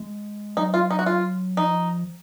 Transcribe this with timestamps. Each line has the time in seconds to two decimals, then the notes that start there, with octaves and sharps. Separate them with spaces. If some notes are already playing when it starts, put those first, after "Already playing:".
Already playing: G#3
0.57 F#3 D#4
0.74 F4
0.91 D#4
0.99 F#4
1.06 F4
1.57 F3 D#4